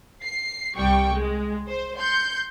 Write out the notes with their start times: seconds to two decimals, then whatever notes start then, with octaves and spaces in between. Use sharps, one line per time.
0.23 C7
0.77 C2 G3 G5 C#6
1.14 G#3
1.69 C5
1.99 C6 G6 C#7